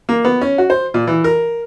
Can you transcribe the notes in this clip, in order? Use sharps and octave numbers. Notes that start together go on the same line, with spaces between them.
A#3
B3
C#4
F#4
C5
A#2
E3
A#4